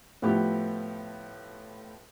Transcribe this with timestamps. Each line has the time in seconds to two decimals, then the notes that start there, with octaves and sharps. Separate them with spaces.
0.22 A2 F3 A3 B3 G4